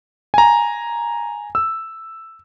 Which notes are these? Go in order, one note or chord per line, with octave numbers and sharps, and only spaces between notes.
G#5 A#5
E6